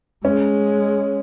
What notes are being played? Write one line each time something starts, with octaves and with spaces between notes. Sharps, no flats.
G#3 C#4